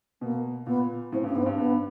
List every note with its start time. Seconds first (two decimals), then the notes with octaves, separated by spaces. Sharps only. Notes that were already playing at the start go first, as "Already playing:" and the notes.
0.21 B2 A#3
0.66 A#2 B3
1.12 A2 C4
1.24 G2
1.27 C#4
1.35 G#2 B3
1.42 C4
1.46 G2
1.58 G2 B3